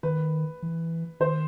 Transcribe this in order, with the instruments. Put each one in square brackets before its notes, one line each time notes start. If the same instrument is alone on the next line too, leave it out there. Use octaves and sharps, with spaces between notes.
[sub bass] D#3 [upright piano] B4
[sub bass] E3
[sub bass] D#3 [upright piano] C5